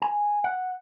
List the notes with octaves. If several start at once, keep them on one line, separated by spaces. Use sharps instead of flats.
G#5
F#5